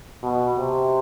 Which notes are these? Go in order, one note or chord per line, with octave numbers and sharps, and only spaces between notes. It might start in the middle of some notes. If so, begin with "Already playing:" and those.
B2
C3